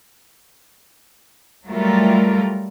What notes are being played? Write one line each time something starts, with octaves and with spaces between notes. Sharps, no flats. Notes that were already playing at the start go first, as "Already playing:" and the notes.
F#3 G3 A3 F4 A4 A#4